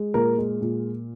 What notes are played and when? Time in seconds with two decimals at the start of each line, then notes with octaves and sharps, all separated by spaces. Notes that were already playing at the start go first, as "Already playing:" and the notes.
Already playing: G#3
0.14 A#2 A#4
0.38 G#3
0.62 A#2